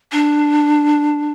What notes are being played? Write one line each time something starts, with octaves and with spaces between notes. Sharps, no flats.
D4